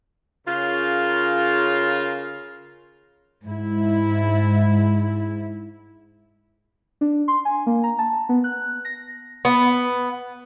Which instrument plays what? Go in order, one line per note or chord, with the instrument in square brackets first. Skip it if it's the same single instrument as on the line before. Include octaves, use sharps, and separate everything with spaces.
[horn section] C#3 F4 A#4
[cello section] G#2 E4
[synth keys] D4
C6
G#5
A#3
A#5
A5
B3
F#6
A#6
[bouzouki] B3